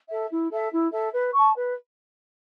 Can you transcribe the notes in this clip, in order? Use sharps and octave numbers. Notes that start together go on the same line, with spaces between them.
A4 E5
E4
A4 E5
E4
A4 E5
B4
A5 C#6
B4